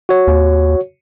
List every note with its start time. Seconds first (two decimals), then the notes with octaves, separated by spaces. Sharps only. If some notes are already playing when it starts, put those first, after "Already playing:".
0.09 F#4 C#5
0.27 D#2